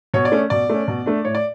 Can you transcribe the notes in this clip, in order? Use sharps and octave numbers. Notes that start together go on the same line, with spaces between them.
B2 C#5
D5
A3 C#4
B2 D5
A3 C#4
B2
A3 D4
A2 C#5
D5